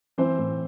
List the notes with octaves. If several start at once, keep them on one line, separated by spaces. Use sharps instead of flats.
E3 C4 C5
A2